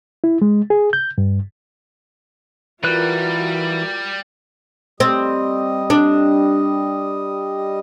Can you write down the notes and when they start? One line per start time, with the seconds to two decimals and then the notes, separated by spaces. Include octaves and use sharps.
0.24 E4
0.42 G#3
0.70 G#4
0.93 G6
1.18 G2
2.84 E3 G3 F4 F#4 A#4 B4 F#6
5.00 G3 C4 D#5
5.90 D4